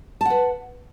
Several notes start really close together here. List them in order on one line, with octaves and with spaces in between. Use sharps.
A5 F#5 B4